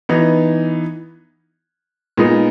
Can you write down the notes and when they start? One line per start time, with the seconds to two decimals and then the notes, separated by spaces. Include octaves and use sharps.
0.09 E3 B3 D#4
2.17 A#2 G#3 B3 D#4